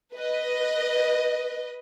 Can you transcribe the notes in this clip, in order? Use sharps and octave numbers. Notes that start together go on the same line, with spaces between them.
B4 D#5